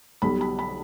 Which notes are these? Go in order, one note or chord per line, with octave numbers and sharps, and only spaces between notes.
B1 B2 G3 B5
B5
B5